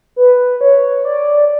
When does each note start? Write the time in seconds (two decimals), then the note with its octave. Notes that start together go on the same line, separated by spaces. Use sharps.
0.16 B4
0.61 C#5
1.05 D5